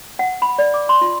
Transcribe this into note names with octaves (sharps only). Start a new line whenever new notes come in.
F#5
B5
D5
D6
C6
F4